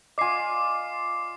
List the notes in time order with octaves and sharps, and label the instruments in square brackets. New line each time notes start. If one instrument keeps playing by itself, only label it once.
[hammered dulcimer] F4 D5 [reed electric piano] D#5 G#5 [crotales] D6 C7